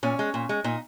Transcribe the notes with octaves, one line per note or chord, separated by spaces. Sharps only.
A#2 C#4
G#3
A#2
G#3
A#2 D#4